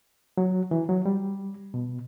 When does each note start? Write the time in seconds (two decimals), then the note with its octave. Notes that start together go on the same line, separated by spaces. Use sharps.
0.37 F#3
0.71 E3
0.89 F#3
1.06 G3
1.74 B2